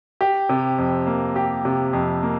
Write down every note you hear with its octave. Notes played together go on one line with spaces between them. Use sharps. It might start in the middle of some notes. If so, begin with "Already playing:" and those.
G4
C3
F2
A#3
G4
C3
F2
A#3